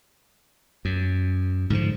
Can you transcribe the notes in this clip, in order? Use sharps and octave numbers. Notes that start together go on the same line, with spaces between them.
F#2
G#2 D3 D#3 F3